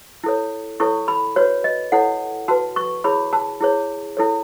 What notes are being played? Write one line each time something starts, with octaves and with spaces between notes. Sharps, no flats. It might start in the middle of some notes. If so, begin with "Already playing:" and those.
E4 A4 C#5
E4 A4 C#5 C#6
B5
F#4 B4 C#5
D#5
E4 A4 C#5 F#5
F#4 B4 A5
C#6
E4 G#4 C#5 B5
A5
E4 G#4 C#5
E4 A4 C#5